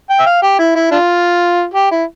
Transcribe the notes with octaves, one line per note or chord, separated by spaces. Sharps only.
G5
E5
F5
G4
E4
E4
D4 F4
G4
E4